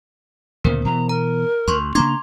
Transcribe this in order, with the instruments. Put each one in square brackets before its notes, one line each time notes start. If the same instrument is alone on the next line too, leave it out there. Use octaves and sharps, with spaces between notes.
[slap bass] D2 A#2 C#3 [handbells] B3 A#4 C5
[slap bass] B2 E3 [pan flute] A#5
[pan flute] A#4 [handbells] A#5
[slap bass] D2 [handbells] C6 C#6
[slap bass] C#3 A#3 D4 [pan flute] A#5 [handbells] C6 D6 G#6